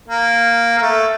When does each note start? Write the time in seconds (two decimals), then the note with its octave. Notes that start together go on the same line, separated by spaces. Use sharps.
0.08 A#3
0.78 A#3
0.82 A3